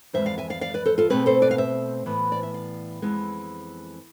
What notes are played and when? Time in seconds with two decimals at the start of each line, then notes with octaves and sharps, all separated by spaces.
0.13 F2 E3 G#3 C5 E5
0.26 D5 F5
0.38 E5 G#5
0.50 D5 F5
0.61 D5 F5
0.74 B4 D5
0.86 A4 C5
0.98 F4 A4
1.10 B2 A3 C4 G#4 B4
1.26 A4 C5
1.42 B4 D5
1.51 F5
1.58 C5 E5
2.06 A2 E3 B3
2.32 D5
2.43 E5
2.54 D5 F5
3.02 F2 E3 G#3 B3